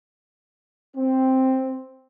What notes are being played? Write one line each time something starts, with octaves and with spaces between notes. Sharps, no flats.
C4